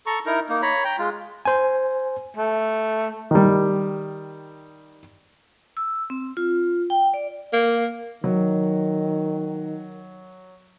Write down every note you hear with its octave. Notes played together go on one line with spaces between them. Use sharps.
A4 A#5 C#6
D#4 E4 A#4 A#5
A#3 D#4
C#5 A#5 B5
G5 A#5
G#3 F4
C5 G#5
A3
D#3 G3
E6
C4
F4
G5
D5
A#3
D#3 F#3